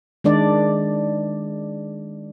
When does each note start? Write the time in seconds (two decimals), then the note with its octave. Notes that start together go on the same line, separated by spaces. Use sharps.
0.24 D#3 G#3 D4 D5